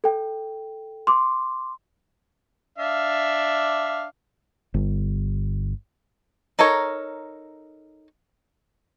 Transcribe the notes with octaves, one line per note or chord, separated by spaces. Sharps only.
A4 G5
C6 D6
D4 E5 F5
G1
D#4 A4 A#4 C#5